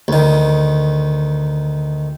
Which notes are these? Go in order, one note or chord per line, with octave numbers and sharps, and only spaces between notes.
D2 D#3